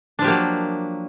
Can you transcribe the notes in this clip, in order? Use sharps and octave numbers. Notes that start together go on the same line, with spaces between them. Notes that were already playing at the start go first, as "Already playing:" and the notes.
F3 F#3 A#3 D4 G4